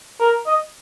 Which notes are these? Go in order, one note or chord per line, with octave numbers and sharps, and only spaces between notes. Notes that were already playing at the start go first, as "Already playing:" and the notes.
A#4
D#5